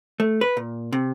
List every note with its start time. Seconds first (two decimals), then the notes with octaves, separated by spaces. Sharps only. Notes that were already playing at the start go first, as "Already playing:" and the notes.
0.20 A3
0.41 B4
0.57 A#2
0.92 C3